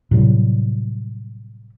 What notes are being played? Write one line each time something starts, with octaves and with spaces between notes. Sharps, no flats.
A2 C3 F#3 G3